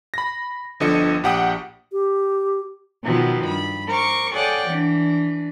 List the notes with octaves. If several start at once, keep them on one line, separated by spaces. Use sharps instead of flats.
B5 A#6
G1 D3 F3 D#5 C#7
A#1 G4 F#5 G5 D#6
G4
B2 D#3 F3 F#3 B3
G2 B5
A#4 C5 C#6 D6
G#4 A4 C#5 D5 F#5 G5
E3 D4